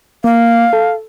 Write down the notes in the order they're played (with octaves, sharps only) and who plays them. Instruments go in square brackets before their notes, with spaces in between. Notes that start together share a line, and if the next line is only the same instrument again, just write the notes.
[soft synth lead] A#3 [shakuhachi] F5
[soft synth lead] A4